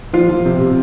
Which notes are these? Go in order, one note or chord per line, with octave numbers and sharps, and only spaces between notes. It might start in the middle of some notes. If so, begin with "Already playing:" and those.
F3 F4
F3
C3
C3